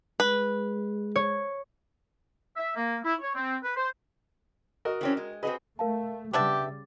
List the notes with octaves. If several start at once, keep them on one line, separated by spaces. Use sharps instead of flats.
G#3 B4
C#5
E5
A#3
E4
C#5
C4
B4
C5
F#4 A#4 D#5
E3 C4 C#4
G#3
C4 F#4 G#4 B4 D#5
A3 A#4 F5 A5
C#3 G3 B3 D4 G4 E5 D6 A6